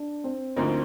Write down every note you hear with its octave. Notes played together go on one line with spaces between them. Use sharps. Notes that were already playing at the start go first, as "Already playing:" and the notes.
Already playing: D4
C4
D2 D3 F3 A#3 C4 D#4